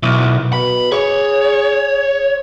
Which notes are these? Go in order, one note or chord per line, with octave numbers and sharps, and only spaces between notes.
B1 E4
B2 B5
G#4 C#5